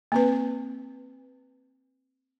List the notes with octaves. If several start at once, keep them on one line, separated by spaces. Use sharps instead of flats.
A#3 C4 B4